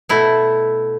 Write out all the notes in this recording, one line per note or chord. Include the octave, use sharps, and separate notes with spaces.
B2 A3 E4